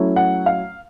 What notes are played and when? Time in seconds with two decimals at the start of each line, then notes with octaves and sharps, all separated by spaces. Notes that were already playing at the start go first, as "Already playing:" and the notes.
Already playing: F#3 A3 C#4 E4
0.16 F#5
0.46 F5